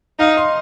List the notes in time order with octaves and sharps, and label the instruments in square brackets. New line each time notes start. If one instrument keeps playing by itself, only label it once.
[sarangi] D#4 [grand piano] F5
[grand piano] C6